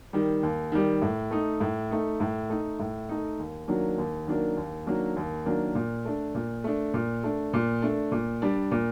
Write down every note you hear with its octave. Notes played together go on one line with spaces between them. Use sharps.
D#3 G3
D#2
D#3 G3
A2
A3 D#4
A2
A3 D#4
A2
A3 D#4
A2
A3 D#4
D#2
D#3 F#3 A#3 D4
D#2
D#3 F#3 A#3 D4
D#2
D#3 F#3 A#3 D4
D#2
D#3 F#3 A#3 D4
A#2
A3 D4
A#2
A3 D4
A#2
A3 D4
A#2
A3 D4
A#2
G3 D4
A#2